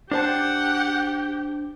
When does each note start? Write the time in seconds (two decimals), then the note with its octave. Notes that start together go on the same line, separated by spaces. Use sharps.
0.11 D4 G4 C5 F#5 G5 A5